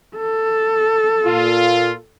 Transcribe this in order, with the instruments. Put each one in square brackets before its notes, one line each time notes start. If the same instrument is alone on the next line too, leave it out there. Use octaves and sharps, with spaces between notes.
[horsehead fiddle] A4
[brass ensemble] A#2 F4